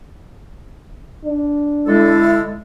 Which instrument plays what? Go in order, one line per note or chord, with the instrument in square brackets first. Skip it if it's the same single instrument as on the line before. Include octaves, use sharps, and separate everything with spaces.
[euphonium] D4
[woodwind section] D3 G#3 A4 [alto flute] E4